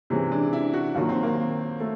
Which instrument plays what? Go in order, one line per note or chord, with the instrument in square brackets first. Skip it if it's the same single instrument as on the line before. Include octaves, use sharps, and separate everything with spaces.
[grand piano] C3 E3 G#3 [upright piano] C#4
[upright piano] D4
E4
F#4
[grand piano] D#2 D#3 F#3 [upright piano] F4
[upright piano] C4
A#3
[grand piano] A3